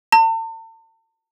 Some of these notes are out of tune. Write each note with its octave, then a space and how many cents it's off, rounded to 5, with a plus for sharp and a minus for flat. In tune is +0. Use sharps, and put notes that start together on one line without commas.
A5 +40